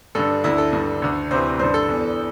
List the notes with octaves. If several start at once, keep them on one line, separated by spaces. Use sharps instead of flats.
G2 D3 A4
D2 D3 E4
A4
G2 D3
D2 D3
D2 C3 E3 C5
G2 D3 C5
A4
E2 E3